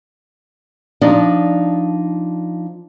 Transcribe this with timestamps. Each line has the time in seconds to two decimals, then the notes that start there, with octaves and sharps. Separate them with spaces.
1.01 F3 D4 D#4 D5 D#5